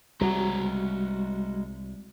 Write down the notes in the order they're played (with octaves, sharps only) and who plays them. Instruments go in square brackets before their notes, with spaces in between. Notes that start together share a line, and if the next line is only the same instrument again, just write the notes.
[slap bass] C2 [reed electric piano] G3 F#4 [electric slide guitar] G#3 C#5 A#5